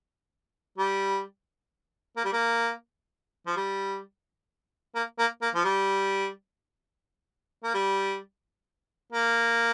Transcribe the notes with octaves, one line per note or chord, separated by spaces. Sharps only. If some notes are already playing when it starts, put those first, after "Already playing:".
G3
A#3
G3
A#3
F3
G3
A#3
A#3
A#3
F3
G3
A#3
G3
A#3